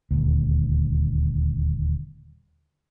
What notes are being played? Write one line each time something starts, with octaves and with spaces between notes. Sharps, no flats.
D#1 D2